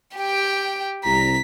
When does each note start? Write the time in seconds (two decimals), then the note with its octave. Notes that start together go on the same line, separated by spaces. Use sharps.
0.17 G4 G5
1.04 C2 A#5 B6